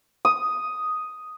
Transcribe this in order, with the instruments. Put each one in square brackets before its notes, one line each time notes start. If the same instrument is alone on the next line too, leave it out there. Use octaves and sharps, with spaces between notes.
[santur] D#6